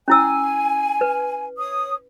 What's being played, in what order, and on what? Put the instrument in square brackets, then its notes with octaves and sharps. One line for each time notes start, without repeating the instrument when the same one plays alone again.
[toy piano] C#4 E4 E6 [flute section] G#5
[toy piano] B4
[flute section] C#5 D#6